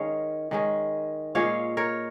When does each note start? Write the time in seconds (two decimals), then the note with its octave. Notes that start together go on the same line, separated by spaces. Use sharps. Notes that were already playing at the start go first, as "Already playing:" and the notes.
Already playing: D#3 G#3 C#4 C#5 F5
0.51 D#3 G#3 C#4
1.35 A#2 G#3 C#4 C#5 F5
1.77 A#4 C#5